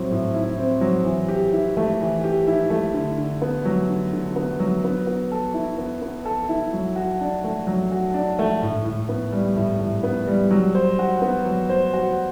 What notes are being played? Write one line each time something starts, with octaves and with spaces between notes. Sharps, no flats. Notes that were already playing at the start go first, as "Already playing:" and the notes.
Already playing: A2 F#3 C4 E4
A2
E4
C4
F#3
E3
G4
E4
A3
E3
G4
E4
A3
D3
D3
B3
F#3
D3
D3
B3
F#3
B3
B3
A4
E4
B3
B3
A4
E4
F#3
F#4
D4
A3
F#3
F#4
D4
A3
A2
A2
B3
G3
A2
A2
B3
G3
F#3
C5
F#4
B3
F#3
C5
F#4